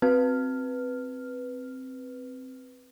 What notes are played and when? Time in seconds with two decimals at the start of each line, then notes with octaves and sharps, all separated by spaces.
0.02 C4 B4 F6